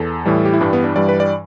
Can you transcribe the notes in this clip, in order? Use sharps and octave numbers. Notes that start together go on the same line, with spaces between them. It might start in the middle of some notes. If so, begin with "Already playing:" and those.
Already playing: E2 A4
A2 E3 G3
G4
E4
G2 E3 G3 D4
B3
D4
G2 E3 G3 D5
B4
D5